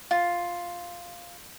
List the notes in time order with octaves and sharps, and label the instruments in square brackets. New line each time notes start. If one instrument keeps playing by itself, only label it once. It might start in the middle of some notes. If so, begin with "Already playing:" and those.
[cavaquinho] F4